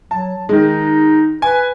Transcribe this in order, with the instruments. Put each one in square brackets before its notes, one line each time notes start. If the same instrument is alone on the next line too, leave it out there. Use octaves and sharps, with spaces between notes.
[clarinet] F#3 [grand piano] A5
[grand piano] D#3 G#3 [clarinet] D#4
[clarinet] B4 [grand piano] G#5